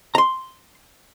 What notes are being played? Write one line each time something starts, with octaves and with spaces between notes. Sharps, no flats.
A#5 C6